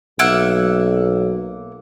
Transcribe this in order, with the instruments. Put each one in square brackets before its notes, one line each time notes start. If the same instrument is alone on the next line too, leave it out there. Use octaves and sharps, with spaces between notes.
[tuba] B1 [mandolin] A#3 E5 F#5